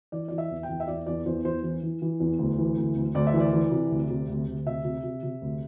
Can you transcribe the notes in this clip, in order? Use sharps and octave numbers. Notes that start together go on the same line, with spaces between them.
E3 D5
E3 D5
E5
E2
G5
E2
E5
E2 D5
E2 D5
E2 C5
E2 C5
E3
E3
E3
E2
D2
E3
D2
D2
D2 D5
E5
E3
D5
E3
C3
D2
C3
D2
D2
C3 E5
C3
C3
C3
D2